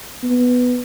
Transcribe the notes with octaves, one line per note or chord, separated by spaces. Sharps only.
B3